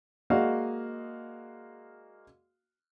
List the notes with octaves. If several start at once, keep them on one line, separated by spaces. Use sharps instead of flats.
G#3 A#3 F#4 D5 D#5 F5